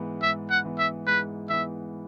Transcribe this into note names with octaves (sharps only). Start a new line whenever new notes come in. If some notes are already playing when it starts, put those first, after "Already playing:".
Already playing: G#2 E3 B3
G#2 E5
F#5
E3 B3
E5
G#2 B4
E3 B3 E5